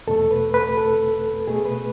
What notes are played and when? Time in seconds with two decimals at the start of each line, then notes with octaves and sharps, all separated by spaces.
0.07 E2 B2 A3 A4
0.31 B4
0.54 B4
0.77 A4
1.47 B2 A3 G#4
1.65 B4